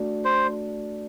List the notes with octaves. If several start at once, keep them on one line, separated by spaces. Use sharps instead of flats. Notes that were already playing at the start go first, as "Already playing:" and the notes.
Already playing: A3 D4 F#4
C5